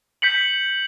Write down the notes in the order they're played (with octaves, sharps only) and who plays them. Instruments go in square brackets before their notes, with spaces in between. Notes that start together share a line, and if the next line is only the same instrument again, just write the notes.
[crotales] G6 B6 C#7 F#7